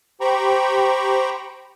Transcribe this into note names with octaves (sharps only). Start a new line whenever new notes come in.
G4 C5 G5 A#5 B5 C#6